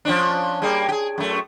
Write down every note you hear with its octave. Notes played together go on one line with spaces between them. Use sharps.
F3 C#4 D4
G3 A#3 G#4
G4 G#4
F#2 A3